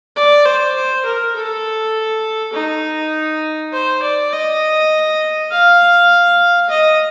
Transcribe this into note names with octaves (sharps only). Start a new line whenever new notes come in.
D5
C5
C5
A#4
A4
D#4
C5
D5
D#5
F5
D#5